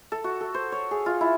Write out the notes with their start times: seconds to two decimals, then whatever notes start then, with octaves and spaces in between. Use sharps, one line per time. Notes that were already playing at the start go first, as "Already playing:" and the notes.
0.12 A4
0.24 F#4
0.41 A4
0.54 C5
0.72 C#5
0.91 G#4
1.06 F4
1.21 E4